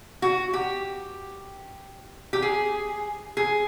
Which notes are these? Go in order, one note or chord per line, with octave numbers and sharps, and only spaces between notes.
F#4
G4
G4
G#4
G#4